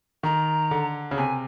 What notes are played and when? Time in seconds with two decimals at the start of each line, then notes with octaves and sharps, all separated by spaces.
0.23 D#3 A#5
0.71 D3
1.11 C#3
1.17 C3 G#5